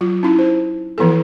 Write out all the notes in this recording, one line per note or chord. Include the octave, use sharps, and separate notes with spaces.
F#3 F4
C#4 D#4 E4
C5
E3 F3 B3 E4 A4